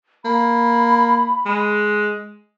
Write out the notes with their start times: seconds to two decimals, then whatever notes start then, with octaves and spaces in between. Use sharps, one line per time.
0.25 A#3 B5
1.46 G#3